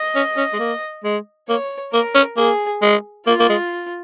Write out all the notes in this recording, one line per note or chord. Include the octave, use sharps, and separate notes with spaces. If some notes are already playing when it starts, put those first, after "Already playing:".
Already playing: D#5
C#4
C#4
G#3
A#3
G#3
A#3 C#5
A#3 A#4
C#4
A#3 G#4
G#3
A#3 F4
A#3
G#3